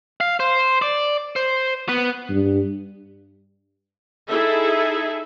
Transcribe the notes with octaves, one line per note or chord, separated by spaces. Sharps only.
F5
C5
D5
C5
B3
G2
D#4 E4 G#4 A4 E5